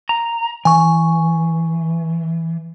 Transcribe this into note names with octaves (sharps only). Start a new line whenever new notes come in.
A#5
E3 G#5 C#6